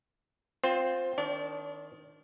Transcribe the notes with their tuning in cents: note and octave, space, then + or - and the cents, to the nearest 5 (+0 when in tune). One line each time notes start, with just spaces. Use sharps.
C4 +0 F4 +20 C5 +0
D#3 +0 D4 -20 D5 -45